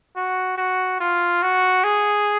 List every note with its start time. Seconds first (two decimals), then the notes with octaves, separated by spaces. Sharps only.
0.16 F#4
0.58 F#4
1.00 F4
1.42 F#4
1.84 G#4